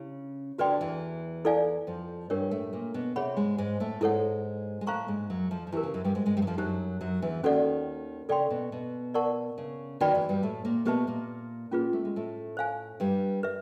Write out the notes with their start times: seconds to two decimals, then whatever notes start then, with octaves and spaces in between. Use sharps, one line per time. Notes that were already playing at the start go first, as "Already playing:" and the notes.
Already playing: C#3 E4 G4
0.58 D2 D3 F#4 B4 D5 G5 C6
0.81 E2 E3
1.45 E4 A4 D5 F5 G#5
1.87 F2 F3
2.30 G2 G3 D4 G4 A#4 C#5
2.51 A2 A3
2.73 A#2 A#3
2.94 B2 B3
3.16 C3 C4 G#4 C#5 F#5 B5
3.37 G#2 G#3
3.58 G#2 G#3
3.80 A2 A3
4.01 G#2 G#3 E4 A4 C#5 F#5
4.81 G#3
4.86 A2 A3 C5 F5 A#5 C#6
5.08 G#2 G#3
5.30 F#2 F#3
5.51 F2 F3
5.67 F3
5.72 E2 E3 E4 G4 A#4
5.83 C#3
5.94 F#2 F#3
6.04 G2 G3
6.15 G#2 G#3
6.26 G#2 G#3
6.37 G2 G3
6.42 F#3
6.47 F2 F3
6.58 F#2 F#3 D#4 G4 C5
7.01 F#2 F#3
7.22 E2 E3
7.43 D#2 D#3 C#4 F#4 A4 D5 F#5
8.29 C#3 A4 D5 G5 C6
8.50 B2
8.72 B2
9.14 A#4 D5 F#5 A5 C#6
9.58 C#3
10.00 D#2 D#3 F#4 B4 D5 G5 B5
10.15 E2 E3
10.29 G2 G3
10.43 A2 A3
10.65 A#2 A#3
10.85 B2 B3 G4 B4 E5 A5
11.07 A#2 A#3
11.71 A#2 A#3 C#4 F4 G#4 B4
11.93 A3
12.05 G#3
12.16 A2 A3
12.57 C5 F5 G#5
13.00 G2 G3
13.43 B4 E5